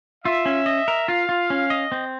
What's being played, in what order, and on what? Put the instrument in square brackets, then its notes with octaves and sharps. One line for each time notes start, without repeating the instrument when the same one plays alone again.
[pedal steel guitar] F4 [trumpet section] E5
[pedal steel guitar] C#4
D#5
A#4
[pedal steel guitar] F4 [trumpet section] F5
[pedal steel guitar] F4
C#4
D#5
C4